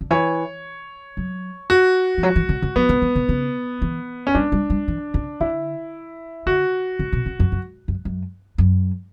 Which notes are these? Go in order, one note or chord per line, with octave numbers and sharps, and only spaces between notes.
D3
E3 C#5
F#3
F#4
E3
F#3
E3
D3
D3
F#3 B3
D3
E3
D3
C#3
E3
C#4
G3 D4
G3
G3
E3
C#3
D3 E4
D3 F#4
D3
B2
C#3
F#2
F#2
F#2
F#2
F#2